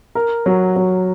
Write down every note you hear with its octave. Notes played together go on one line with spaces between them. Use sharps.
A#4
F#3
F#3